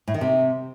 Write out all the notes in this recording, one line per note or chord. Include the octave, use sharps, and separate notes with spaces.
A2
D#3
C3